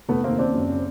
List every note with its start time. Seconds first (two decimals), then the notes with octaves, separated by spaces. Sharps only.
0.09 F1 A3 B3
0.24 D#2 A#3 C4
0.39 C#3 C4 D4
0.54 F#2
0.70 C#3